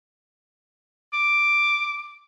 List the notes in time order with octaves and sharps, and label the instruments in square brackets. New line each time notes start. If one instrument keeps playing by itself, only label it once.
[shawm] D6